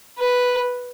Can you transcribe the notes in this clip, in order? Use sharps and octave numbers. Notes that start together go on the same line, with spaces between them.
B4